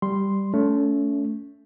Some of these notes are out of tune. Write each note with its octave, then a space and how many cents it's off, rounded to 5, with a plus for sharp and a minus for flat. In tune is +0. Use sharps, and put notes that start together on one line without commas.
G3 +0 C6 +0
A3 +0 C#4 +35